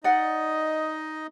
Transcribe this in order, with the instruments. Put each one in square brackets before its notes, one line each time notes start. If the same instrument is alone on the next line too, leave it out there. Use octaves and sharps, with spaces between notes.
[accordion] D#4 D#5 [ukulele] D5 F#5